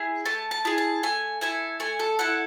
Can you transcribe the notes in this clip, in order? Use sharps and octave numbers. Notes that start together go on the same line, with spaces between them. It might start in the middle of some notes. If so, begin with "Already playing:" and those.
Already playing: E4 G#4
A3 A5
A5
E4 G#4
A5
A3 G#5
E4 A4 G#5
A3 G#5
A4
E4 A4 F#5